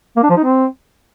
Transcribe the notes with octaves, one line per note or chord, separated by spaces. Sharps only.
A#3
D4
F3
D#4
C4